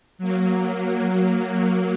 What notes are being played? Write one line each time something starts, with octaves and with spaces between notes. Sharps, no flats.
F#3 A#3